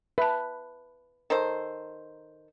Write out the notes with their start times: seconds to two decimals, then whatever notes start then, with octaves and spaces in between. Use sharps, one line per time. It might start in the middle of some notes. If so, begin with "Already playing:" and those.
0.18 B4 E5 A5
1.30 D#3 A4 C5